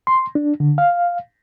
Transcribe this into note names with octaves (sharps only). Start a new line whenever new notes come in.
C6
D4
D3
F5